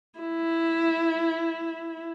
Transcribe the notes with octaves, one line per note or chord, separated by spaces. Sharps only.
E4